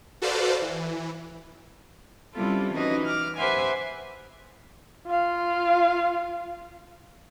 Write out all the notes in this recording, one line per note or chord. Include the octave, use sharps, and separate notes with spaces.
F#4 A4 B4 C5 D5 F5
E3
C3 G3 C#4 E4 F4 A4
E3 C#4 D#4 F#4 B4 D#5
D6 F6
G4 B4 C5 E5 F#5 G#5
F4 F5